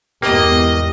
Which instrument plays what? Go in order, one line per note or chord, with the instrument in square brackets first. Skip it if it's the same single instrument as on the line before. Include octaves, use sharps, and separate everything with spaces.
[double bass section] E2 G#2 [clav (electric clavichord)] A#3 [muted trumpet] G4 [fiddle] D#5